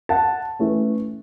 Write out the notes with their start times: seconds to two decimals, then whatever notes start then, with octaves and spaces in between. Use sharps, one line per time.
0.09 F#5 A5
0.59 E3 A3 C#4